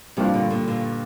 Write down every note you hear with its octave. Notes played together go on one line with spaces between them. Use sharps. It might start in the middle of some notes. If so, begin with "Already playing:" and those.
G2 C3 F3 G3 A#3 D4 F4
A#2 D3
A#2 D3
A#2 D3